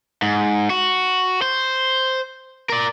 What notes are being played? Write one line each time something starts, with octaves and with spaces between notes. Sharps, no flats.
G#2
F#4
C5
A#4 D5